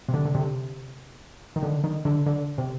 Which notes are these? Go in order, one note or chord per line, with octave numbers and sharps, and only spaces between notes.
C3
D3
D3
C3
D#3
D3
D#3
D3
D3
C3